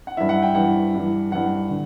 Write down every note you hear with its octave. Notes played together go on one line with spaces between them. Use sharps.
F#5
G2 E3 E5
F#5
G5
G2 E3 F#5
G2 E3
G2 E3 F#5
D3